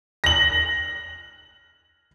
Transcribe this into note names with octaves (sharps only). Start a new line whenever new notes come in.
A#6 F#7